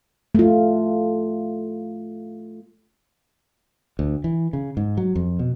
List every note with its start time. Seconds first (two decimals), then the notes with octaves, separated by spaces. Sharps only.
0.35 A3 F4
3.99 D2
4.24 E3
4.53 C#3
4.77 G#2
4.97 F#3
5.16 F2
5.39 B2